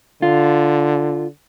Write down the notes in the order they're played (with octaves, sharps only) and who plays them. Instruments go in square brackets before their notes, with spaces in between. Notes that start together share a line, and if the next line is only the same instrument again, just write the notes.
[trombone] D3 [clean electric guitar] F4